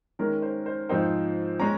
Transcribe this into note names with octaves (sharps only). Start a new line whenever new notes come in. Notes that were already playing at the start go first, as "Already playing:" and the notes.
D#3 G#3 C#4 A#4
C5
C5
G#2 F3 C4 D#4 C5
G#3 C#4 A#5